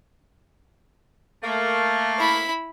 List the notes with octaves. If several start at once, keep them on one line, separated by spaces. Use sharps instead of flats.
A3 A#3
E4 B5